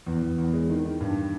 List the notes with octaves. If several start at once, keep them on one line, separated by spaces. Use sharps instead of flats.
E2
E2
E2
G#3
D#3
D#3
G2